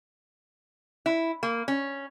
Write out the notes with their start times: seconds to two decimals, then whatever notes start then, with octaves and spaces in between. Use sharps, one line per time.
1.06 E4
1.43 A#3
1.68 C#4